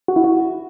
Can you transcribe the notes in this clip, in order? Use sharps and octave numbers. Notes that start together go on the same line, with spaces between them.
F#4
E4
F#4